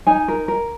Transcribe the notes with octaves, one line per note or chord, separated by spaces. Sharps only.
D#4 G#5
A#4
A#4